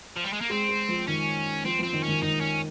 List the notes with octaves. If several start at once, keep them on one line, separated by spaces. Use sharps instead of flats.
F3
G3
G#3
A#3
G#3 C4
G#3
F3
D#3 C#4
F3 C4
F3 C4
D#3
C#4
D#3
D#3 D#4
C#4